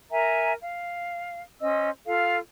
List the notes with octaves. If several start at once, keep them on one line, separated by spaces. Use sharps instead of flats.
A#4 E5 G#5 A#5
F5
C#4 C5 D#5 E6
F4 A4 F5